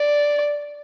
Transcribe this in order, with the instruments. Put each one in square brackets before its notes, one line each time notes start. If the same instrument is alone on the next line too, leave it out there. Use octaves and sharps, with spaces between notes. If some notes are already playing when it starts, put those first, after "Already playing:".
Already playing: [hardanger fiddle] D5